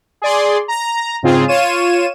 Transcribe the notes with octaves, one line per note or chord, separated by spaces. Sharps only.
G#4 D5 C6
A#5
G#2 C#3 C4 F4 G#4
F4 C#5 D#7 E7